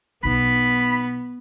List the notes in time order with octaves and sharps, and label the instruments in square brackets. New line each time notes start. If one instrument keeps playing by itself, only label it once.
[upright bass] B1 D#4 [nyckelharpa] B3 [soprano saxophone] B5